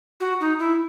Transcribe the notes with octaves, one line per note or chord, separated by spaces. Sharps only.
F#4
D#4
E4